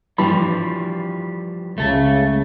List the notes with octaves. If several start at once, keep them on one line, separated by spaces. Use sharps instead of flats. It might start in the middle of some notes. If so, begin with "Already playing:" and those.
G2 E3 F3 G3 B5
C#2 C#3 A3 A4